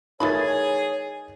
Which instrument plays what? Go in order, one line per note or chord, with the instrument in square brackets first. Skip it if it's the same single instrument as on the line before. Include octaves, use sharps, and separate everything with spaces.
[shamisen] E3 A3 B5 [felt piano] D#4 A#4 A6 [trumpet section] G#4 [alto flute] C#5